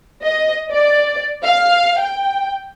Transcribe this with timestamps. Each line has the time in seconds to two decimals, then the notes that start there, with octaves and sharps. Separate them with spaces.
0.22 D#5
0.71 D5
1.43 F5
1.98 G5